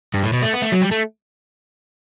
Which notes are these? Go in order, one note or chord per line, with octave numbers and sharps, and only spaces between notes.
G2
A2
B2
A3
B3
A3
F#3
G3
A3